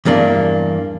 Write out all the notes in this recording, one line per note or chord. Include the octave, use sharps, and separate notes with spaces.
E2 G2 A#3 D4